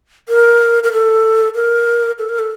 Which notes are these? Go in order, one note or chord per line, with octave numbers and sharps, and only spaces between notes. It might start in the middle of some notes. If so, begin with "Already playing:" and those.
A#4
A#4
A4
A#4
A4
A#4
A4